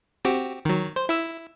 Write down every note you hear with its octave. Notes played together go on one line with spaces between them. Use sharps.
C4 F#4 G4
D#3 F#3
C5
E4 E6